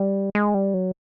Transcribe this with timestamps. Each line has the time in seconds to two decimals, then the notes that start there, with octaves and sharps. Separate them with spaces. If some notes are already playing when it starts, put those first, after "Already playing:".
Already playing: G3
0.35 G#3
0.54 G3
0.74 F#3